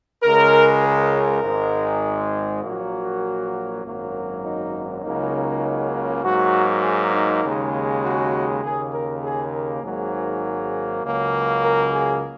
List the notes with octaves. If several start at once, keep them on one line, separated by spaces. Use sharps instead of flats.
C#2 C#3 G#3 A#4
A#4
G#1 G#2 G#3
A#1 A#2 F#3 A#3 F#4
G#1 F#2 F#3 A#3
D#4
C#2 C#3 F#3 A#3 D#4
G#2 F#3 A#3 F#4
G#4
D#4
D#2 C#3 G#3
F#4
D#2 C#3 A#3 G#4
A#4
G#4
A#4
G#1 G#2 F#3 A#3 G#4
C#2 C#3 F#3 A#3
A#4
G#4